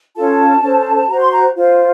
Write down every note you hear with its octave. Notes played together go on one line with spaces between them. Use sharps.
C#4 F4 A4 A5
C#4 A4 C5
F#4 C5 A#5
C6
A#5
F4 C5